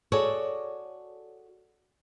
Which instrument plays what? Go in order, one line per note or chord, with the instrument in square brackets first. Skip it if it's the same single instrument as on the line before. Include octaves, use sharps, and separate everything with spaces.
[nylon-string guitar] F#4 G#4 A4 C#5 D5